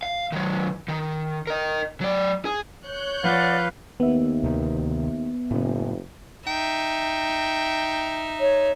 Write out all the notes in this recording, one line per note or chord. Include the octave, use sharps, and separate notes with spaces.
F5
D#3 F#3
D#3
A#4 D#5
F#3 D5
G#4
C#5 F#6 G6
F3 B4 D5 F5 F#5 D6
D#2 B3 E5
D2 C3 D#3
F#1 A2 C#3
D#4 E5 G5
C#5